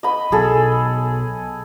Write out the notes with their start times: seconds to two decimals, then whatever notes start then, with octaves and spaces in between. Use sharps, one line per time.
0.03 D#5 B5
0.32 B2 F#3 G#4 A4